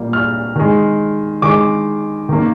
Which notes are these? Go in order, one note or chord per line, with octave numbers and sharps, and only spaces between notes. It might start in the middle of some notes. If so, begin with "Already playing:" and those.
Already playing: A#2 G3 A#3
F6
D#3 G#3
D#3 G#3 D6
D#3 A#3